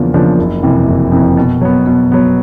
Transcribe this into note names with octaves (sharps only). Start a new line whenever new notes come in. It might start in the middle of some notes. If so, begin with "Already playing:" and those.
Already playing: E2 C#3 F3 A#3 D4
C#3 F3 A#3 D4
F#1
F2 C3 E3
F#1
F2 C3 E3
B2
F#3 B3
B2
F#3 B3